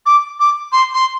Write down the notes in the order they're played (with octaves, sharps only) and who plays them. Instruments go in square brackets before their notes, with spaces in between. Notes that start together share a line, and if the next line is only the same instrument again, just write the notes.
[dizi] D6
D6
C6
C6